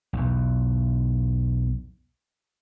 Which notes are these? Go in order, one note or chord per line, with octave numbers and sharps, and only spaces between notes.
B1 E2